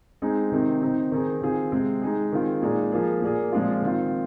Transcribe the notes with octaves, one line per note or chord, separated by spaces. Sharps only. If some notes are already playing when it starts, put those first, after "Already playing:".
G#3 C4 D#4 G#4
C3 D#3 C4 D#4
D#3 C4 D#4
D#3 C4 D#4 G#4
D#3 C4 F4 G#4
C3 G#3 C4 G#4
G#3 D#4 G#4
D#3 C4 F4 G#4
A#2 G#3 D#4 G#4
F3 A#3 G#4
A#2 A#3 G#4
A#2 F3 G#3 C4 F4
D#3 C4 F4